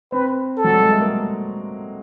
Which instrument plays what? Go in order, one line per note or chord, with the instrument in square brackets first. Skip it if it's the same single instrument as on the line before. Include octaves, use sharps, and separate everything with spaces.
[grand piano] C4 [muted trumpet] B4
[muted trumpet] A4
[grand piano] F#3
G3
G#3
A3
A#3